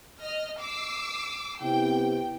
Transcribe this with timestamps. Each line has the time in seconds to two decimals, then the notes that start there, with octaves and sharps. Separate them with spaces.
0.21 D#5 F6
0.60 D6 E6 C7
1.61 C3 B3 E4 G5